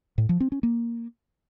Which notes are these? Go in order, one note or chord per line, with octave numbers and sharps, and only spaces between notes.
A2
F3
C4
C#4
A#3